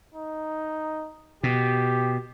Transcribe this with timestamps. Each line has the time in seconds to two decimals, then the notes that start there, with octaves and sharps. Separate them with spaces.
0.15 D#4
1.44 B2 G4